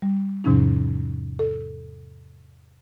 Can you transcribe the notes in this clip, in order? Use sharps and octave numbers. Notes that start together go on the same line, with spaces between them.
G3
E2 G#2 C3 F3 C#4 D#4
A4